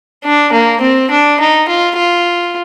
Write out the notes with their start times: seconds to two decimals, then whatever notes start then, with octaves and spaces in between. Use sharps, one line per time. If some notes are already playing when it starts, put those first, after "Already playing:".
0.24 D4
0.52 A#3
0.81 C4
1.11 D4
1.40 D#4
1.68 F4
1.96 F4